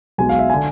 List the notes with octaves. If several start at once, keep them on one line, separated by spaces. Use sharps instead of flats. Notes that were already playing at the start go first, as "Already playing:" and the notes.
B1 B2 G#3 G#5
F5
E5
D3 G#5